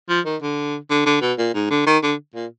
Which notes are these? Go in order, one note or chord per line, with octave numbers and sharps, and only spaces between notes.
F3
D#3
D3
D3
D3
B2
A#2
G#2
D3
D#3
D3
A#2